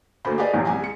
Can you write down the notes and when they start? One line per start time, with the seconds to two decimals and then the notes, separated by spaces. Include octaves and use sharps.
0.25 D2 A3 A#3 F#4 C5 B5
0.38 G4 G#4 B4 D5 D#5
0.54 A1 E2 D#3 F3
0.67 C2 G#5
0.80 G#3 C#7